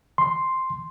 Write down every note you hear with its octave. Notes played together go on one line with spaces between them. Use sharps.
C6